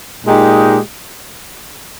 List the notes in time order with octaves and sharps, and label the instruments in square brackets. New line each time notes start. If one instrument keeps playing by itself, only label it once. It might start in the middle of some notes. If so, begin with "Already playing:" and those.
[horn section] A#2 G#3 D#4 G4